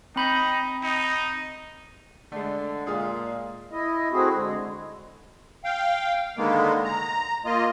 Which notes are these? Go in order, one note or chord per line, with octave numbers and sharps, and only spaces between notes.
C4 D#4 B5 G6
D#4
D3 G#3 A3
A#2 G#3 F4 G#4
E4 D#5
A3 C4 E4 F#4 G#4
D3 G#3
F5 G5
D3 D#3 G#3 A#3 B3
A#5
A#3 F4 D#5